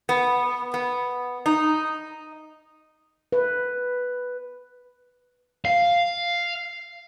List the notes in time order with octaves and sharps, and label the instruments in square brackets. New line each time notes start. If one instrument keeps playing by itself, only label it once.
[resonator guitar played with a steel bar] B3
B3
D#4
[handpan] B4
[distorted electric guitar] F5